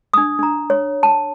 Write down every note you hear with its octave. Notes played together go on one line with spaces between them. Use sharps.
D4 D#6
D4 A#5
C#5
A5